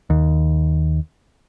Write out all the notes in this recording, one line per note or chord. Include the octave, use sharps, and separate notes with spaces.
D#2